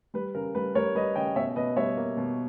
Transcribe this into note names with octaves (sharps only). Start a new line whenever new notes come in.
G3 B4
C#3 A#4
G3 B4
G3 A#4 C#5
G3 B4 D#5
C#3 D#5 G5
B2 C#5 E5
B2 B4 D#5
G3 C#5 E5
A#3
B2